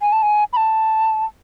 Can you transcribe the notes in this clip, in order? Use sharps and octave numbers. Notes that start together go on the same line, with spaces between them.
G#5
A5
G#5
B5
A5